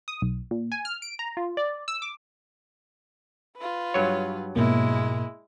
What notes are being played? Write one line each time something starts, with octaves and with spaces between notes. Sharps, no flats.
D#6
B1
A#2
G#5
F6
D7
A#5
F4
D5
E6
D6
F4 B4
G2 F#3 C#5
G#2 B2 G#3 A#3 E4